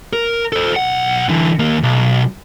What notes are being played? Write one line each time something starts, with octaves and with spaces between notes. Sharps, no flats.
A#4
A4 C5
B1 F#5
D3 E3
D#2 A#3
B1